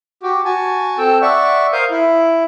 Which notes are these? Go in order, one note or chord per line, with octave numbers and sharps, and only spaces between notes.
F#4 G4
F#4 G#5 A5
C4 A4 G5 E6
D5 E5 F#5 C#6
A#4 C5 F5 D#6 G6
E4